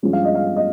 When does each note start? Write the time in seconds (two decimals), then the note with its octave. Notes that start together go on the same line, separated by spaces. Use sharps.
0.03 G2 F3 G#3 C#4
0.13 F5
0.25 D#5
0.35 F5
0.57 D#5